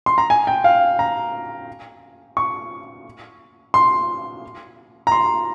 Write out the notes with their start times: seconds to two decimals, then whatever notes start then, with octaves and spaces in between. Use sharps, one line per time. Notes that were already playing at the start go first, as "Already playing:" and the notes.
0.06 C6
0.18 A#5
0.30 G#5
0.47 G5
0.64 F5
0.99 A#5
2.37 C#6
3.74 C6
5.07 A#5
5.12 C6